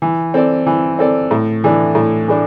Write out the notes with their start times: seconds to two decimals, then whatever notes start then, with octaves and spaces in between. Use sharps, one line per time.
0.02 E3
0.34 C4 A4 D5
0.66 E3
0.99 C4 A4 D5
1.31 A2
1.64 E3 A3 D4
1.95 A2
2.28 E3 A3 D4